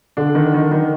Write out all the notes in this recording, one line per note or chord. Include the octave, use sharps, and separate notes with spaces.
D3 D4
D#3
D#3
D#3